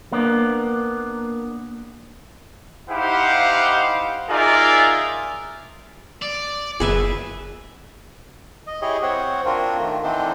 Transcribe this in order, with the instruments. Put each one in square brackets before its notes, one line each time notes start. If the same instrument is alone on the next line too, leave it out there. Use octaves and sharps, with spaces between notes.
[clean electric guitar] A#3 B3 D4
[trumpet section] D#4 E4 G4 C5 F5 F#5
D#4 F4 G#4 A#4 D5 E5
[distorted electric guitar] D5
[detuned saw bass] F#1 [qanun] G#4 B4 E5
[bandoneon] D#5
E4 G4 G#4 C#5 D#5
C4 C5 C#5 F#5
C4 D4 F4 F#4 A#4
D#3 A3
D3 E3 C4 D4 D#4 C5